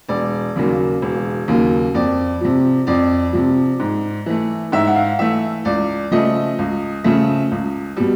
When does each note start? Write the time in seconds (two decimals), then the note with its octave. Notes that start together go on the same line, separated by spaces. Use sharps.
0.09 E1 D5
0.56 D#2 C#3 F#3 A#3
1.02 E1
1.48 D#2 C#3 F#3 A#3
1.94 F2 D5
2.41 C3 F3
2.87 F2 D5
3.33 C3 F3
3.80 G#2
4.26 E3 A3
4.72 G#2 E5
4.87 F#5
4.96 F5
5.19 E3 A3 E5
5.65 C#2 D5
6.11 C#3 F3 A3 D#5
6.59 C#2
7.04 C#3 F3 A3
7.51 C#2
7.97 B2 G3